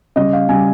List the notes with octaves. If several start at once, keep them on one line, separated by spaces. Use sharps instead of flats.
C#3 G3 D#5
F5
C#3 G3 G#5